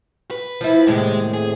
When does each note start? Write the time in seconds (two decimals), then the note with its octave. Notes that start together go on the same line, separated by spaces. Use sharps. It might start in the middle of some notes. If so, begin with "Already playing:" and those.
0.31 B4
0.61 F3 E4
0.87 D#2 A2 C3 G#3
1.34 G#4